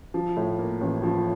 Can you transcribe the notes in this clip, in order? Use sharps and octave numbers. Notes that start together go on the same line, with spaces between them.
F3
A2
A#3
A1
F3